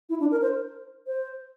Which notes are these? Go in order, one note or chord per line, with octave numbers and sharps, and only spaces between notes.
E4
D4
A#4
C5
C5